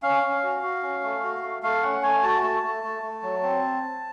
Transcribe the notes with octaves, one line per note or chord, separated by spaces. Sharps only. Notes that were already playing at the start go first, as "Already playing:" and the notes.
C#4 F5
C#4
F#4
F#4
C#4
A3
F#4
A3
A3 F5
C#4 F#5
A3 G#5
F#4 A5
A3 A5
A3
A3
A3
F#3
C4